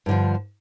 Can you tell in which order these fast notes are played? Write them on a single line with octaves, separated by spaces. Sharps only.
G2 D3 F3